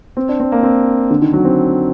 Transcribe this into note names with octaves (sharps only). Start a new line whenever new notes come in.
C4
D4
C4
A#3
C4
D3
D#3
F#3
C4